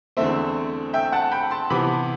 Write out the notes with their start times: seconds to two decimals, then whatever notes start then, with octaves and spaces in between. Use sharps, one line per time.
0.17 E2 D3 A3 C4 C5 E5
0.93 E5 G5
1.12 F#5 A5
1.32 G5 B5
1.51 A5 C6
1.70 C3 E3 B3 B5 D6